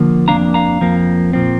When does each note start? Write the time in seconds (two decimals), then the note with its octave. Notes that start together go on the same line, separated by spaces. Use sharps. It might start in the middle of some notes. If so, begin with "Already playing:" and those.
Already playing: D3 F3 A#3
0.28 F2 F3 A#3 D4 F5 A#5
0.54 F5 A#5
0.81 F2 F3 A#3
1.33 A#2 F3 C4